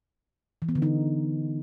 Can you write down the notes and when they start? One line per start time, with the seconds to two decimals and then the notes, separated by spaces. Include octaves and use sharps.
0.62 E3
0.69 B3
0.75 D3
0.82 D#4